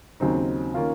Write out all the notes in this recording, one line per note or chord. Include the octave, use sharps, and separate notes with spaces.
D#2 C#3 F#3 C4 D#4
D#3 A#3 C#4 F4